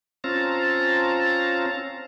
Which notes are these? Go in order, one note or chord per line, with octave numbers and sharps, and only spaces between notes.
C4 C#4 F4 A5 A#5